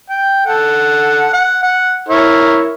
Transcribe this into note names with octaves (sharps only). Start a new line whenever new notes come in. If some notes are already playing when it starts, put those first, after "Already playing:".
G5
A4 F#5
F#5
F#5
E4 A#4 C#5